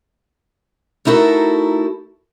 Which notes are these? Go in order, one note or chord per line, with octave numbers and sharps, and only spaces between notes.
A3 D#4 E4 F#4 A4 A#4